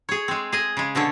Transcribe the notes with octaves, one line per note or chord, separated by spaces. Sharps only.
G#4 C#5
G#3 C4
G#4 D#5 G#5
C#3 G#3
B2 D3 A4 C#5